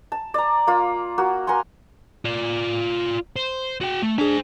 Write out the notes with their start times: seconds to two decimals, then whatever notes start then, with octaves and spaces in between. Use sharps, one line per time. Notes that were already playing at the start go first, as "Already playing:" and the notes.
0.12 A5
0.34 D5 A#5
0.67 A#3 F4
1.18 A#3 F#4
1.47 A#4 F#5 G#5 C6
2.25 F4 D5
3.36 C5
3.81 F#4 G5
4.02 A3
4.18 D4 G#4 C5 G#5